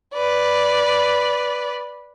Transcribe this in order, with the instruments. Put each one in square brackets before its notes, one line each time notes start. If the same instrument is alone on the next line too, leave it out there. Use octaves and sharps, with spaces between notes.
[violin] B4 D5